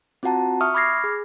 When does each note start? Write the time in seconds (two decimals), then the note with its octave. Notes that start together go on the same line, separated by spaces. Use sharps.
0.23 C4 F4 F#4 F#5 A5 A#5
0.61 E5 C#6 D#6 F6
0.74 B5 D6 F6 G#6 A#6 C7
1.04 G#4